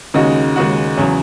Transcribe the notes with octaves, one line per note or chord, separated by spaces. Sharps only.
D#2 C#3 G#3 D#4 F#4
D#2 C#3 G#3 D#4 F#4
E2 C#3 F#3